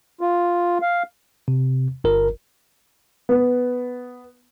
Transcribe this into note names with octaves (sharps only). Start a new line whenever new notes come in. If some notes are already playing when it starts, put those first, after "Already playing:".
F4
F5
C3
G1 A#4
B3